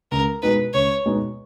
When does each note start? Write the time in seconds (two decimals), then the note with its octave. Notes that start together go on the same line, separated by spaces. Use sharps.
0.11 C#2 A#4
0.43 B2 G#3 B3 D#4 B4
0.74 C#2 C#5
1.06 B2 G#3 B3 D#4